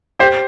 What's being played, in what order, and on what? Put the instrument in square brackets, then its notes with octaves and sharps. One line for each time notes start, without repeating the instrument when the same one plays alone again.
[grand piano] G4 C5